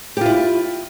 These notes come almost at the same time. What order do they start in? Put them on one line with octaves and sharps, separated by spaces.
G4 F4 E4